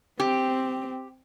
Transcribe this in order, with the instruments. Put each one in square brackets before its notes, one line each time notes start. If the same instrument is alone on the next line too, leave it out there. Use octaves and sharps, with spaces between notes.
[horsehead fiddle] C4 [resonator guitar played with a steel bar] G4